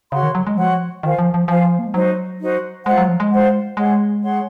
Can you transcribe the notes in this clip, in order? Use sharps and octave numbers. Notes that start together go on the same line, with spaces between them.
C#3 F#4 C#5 F#5 C6
D#3
F#3
G#3
F3 F#4 C#5 F#5 C6
D#3 F4 C5 F5 G#5
F3
F3
F3 F4 C5 F5 G#5
A#3
G#3
F#3 D#4 F#4 C5
D#4 F#4 C5
G#3 F4 C5 F#5
F#3
F3
G#3
F4 C5 F#5
G#3 G#4 C#5 F#5 C6
G#4 C#5 F#5 C6